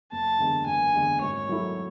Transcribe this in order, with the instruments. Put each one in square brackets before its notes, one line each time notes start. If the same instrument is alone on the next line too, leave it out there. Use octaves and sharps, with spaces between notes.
[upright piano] F#1 [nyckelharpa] A5
[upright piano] E2 D3 G#3 B3
[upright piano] F#1 [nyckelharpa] G#5
[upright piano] E2 D3 G#3 B3
[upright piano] G#1 [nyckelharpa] C#5
[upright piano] G#2 F#3 A3 E4